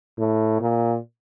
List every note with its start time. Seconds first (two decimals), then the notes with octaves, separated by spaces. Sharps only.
0.19 A2
0.61 A#2